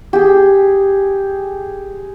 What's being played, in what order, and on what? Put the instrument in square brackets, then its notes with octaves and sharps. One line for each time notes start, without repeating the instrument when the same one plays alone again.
[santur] G4 G#4